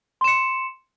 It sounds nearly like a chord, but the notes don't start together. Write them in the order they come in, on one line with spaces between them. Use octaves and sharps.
C6 E7 C#7